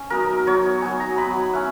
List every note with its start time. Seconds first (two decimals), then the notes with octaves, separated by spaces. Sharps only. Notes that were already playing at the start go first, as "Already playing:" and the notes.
Already playing: C#4
0.10 F#3 B3 D#4 A#4
0.46 F#3 B3 D#4 C#5
0.82 F#3 B3 D#4 G#5
1.00 A#5
1.17 F#3 B3 D#4 B5
1.53 C#4 E4 F#5